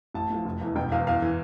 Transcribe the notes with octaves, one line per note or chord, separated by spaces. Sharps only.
A1 A5
A2 F3
F1
E2 E3
E1 G5
E2 E3 F5
E2 F5
E3